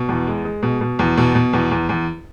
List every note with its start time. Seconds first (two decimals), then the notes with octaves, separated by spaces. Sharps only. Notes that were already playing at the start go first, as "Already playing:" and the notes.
Already playing: B2
0.09 E2
0.27 G#3
0.45 G#3
0.63 B2
0.81 B2
0.99 E2
1.18 B2
1.35 B2
1.53 E2
1.71 E2
1.89 E2